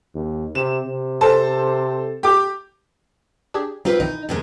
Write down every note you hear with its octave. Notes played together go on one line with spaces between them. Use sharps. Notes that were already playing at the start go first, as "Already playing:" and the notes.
D#2
C3 E7
C3
A4 C5 A5
G4 D6
D4 G4 G#4
G3 C4 D#4 F4 B4
B1 D#3 E3 D#4
D#2 C3 G#3